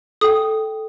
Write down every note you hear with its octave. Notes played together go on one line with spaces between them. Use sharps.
A4 G5 D#6